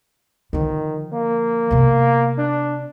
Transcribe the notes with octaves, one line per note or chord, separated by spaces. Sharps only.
D3 D#3 F3
A#3
C3 B3
D4